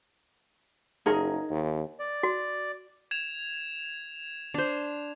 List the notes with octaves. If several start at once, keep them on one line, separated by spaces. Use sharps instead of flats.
F#1 D#4 G#4 A#4
D#2
D5
F#4
G#6 E7 F7
D4 C5